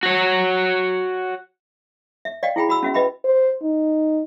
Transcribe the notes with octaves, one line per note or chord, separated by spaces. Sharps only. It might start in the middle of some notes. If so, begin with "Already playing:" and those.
F#4 C#5
E5
D5 D#5 F5 G5
E4 G#4 G5 B5
F#4 B5 E6
C#4 F#4 E5
B4 D#5 E5 G5 B5
C5
D#4